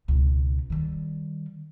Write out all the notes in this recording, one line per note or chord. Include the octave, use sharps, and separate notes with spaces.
C#2 B2
D#3 G3